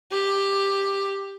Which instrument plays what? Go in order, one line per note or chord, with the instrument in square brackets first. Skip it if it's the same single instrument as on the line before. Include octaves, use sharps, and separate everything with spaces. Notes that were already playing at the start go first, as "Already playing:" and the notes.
[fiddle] G4